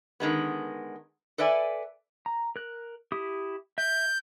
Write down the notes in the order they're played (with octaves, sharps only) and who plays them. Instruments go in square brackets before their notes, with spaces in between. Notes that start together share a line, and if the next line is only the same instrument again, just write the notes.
[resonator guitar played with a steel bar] D3 D#3 G#3 B3
A4 B4 D5 E5 G#5
[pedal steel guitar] A#5
A#4 F#6
E4 G4 D#6
[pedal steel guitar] E5 [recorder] G6